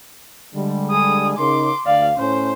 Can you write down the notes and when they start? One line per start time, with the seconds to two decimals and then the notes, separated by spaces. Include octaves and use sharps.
0.55 D3 G3 G#3
0.90 G#4 D#6
1.37 C#3 D#4 A#4 C6 D6
1.86 D2 D5 F5
2.17 A2 C#4 C5